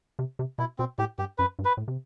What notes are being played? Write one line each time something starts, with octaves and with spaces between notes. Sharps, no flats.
C3
C3
B2 E4
B2 C4
A2 G4
G2 G4
F#2 B4
G2
B4
A2
C3